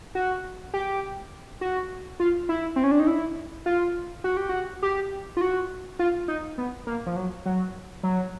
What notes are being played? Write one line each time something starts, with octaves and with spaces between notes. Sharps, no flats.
F#4
G4
F#4
F4
E4
C4
C#4
D4
D#4
E4
F4
F#4
G4
F#4
G4
F4
F#4
F4
D#4
B3
A#3
F3
F#3
F#3
F#3